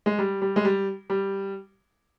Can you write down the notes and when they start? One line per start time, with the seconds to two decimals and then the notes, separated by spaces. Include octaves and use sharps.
0.06 G#3
0.19 G3
0.42 G3
0.56 G#3
0.65 G3
1.10 G3